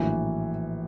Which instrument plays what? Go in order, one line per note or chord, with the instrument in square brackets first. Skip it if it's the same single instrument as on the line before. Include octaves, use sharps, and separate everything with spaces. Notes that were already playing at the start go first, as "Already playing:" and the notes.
Already playing: [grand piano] A#1 A2 F#3 A#3 [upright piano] E3